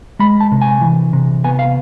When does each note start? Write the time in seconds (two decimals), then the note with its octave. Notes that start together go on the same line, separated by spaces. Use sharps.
0.19 G#3 B5
0.40 A5
0.52 C3
0.61 G#5
0.81 E3
1.13 C3
1.44 B3 G#5
1.59 F5